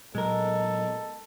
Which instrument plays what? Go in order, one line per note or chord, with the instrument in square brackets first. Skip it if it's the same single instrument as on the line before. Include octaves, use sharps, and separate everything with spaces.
[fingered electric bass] A#2 F#3 B3 [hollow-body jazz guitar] G#3 A#4 [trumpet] A4 [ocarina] D#5